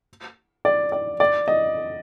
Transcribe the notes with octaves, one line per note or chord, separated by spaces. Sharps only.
D5
D5
D5
D#5